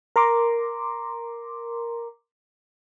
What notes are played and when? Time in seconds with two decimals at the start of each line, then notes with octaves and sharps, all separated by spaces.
0.16 A#4 A#5 C6 D6